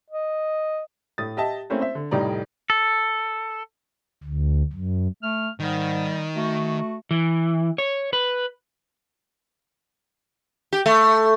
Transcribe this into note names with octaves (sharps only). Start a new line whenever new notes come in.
D#5
A2 D#6 A6
G4 D#5 E5 A5
A3 A#3 C4 C#4 E4 C5
C5 E5
D3
F1 A2 G3 D#4 D5 A#5
A4
D2
F#2
A3 F6
G#2 D#3 G3
A3 F#4
E3
C#5
B4
G4
A3